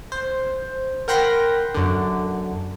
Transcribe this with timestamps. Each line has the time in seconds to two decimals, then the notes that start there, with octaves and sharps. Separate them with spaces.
0.12 C5
1.08 A#4 F#5 G5 B5 C6 A#6
1.74 F#2 D3